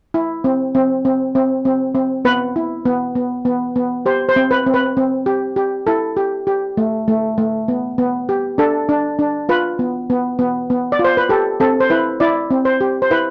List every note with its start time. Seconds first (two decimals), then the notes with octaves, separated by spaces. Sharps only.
0.14 E4
0.44 C4
0.75 C4
1.05 C4
1.35 C4
1.65 C4
1.95 C4
2.25 B3 B4
2.56 E4
2.85 B3
3.15 B3
3.45 B3
3.76 B3
4.06 G4 C5
4.29 C5
4.36 C4
4.51 B4
4.66 C4
4.74 B4
4.97 C4
5.26 G4
5.56 G4
5.87 E4 A4
6.17 G4
6.47 G4
6.77 A3
7.08 A3
7.38 A3
7.68 B3
7.98 B3
8.29 G4
8.58 D4 A4
8.89 D4
9.19 D4
9.49 F4 B4
9.79 B3
10.10 B3
10.39 B3
10.70 B3
10.92 D5
10.99 F4
11.04 C5
11.17 B4
11.29 G4 A4
11.60 C4 A4
11.80 C5
11.90 E4 B4
12.20 E4 D5
12.51 C4
12.65 C5
12.81 G4
13.02 C5
13.11 E4 B4